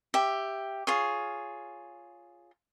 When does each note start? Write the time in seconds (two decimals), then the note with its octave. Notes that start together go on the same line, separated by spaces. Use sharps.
0.14 G4 E5
0.87 F4 G#4 C#5